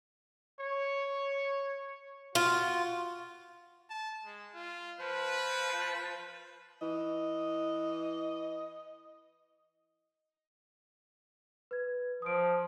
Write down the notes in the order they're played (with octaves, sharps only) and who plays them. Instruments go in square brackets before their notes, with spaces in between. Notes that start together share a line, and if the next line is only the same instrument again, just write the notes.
[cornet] C#5
[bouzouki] F4 [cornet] F#4
[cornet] A5
G#3
F4
[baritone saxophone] F3 [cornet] B4
[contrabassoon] E3 [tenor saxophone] D#5
[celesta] B4 G#6
[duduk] F3 [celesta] D#6 D7